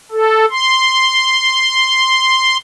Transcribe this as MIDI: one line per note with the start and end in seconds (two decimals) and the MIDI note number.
0.11 0.45 69
0.51 2.57 84